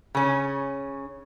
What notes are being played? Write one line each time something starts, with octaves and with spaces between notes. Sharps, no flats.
C#3 C#4